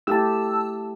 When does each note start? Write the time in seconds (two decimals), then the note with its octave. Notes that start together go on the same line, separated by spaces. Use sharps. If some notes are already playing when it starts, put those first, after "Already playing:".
0.07 A3 E4 G4 A5 E6